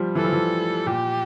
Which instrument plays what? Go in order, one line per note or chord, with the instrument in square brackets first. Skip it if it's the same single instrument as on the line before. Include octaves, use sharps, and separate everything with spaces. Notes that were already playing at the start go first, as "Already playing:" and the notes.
Already playing: [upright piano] F3 G3
[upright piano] E3 [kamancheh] A4
[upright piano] F3
E3
[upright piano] A#2 [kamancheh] G4